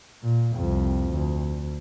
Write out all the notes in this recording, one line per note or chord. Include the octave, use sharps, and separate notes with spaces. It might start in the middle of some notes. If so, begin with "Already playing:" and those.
A#2
C2 F2
D2